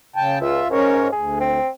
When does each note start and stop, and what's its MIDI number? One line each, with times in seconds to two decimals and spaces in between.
0.16 0.39 49
0.16 0.39 79
0.16 0.39 81
0.41 0.61 37
0.41 0.68 65
0.41 0.68 76
0.71 1.12 44
0.71 1.08 61
0.71 1.08 70
0.71 1.08 73
1.12 1.59 38
1.12 1.37 68
1.40 1.68 60